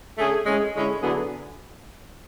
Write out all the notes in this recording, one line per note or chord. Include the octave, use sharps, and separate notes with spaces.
D3 A3 C#4 G#4
A2 G#3 C#4 G#4
D3 G#3 C#4 E4
D3 F#3 B3 E4 G#4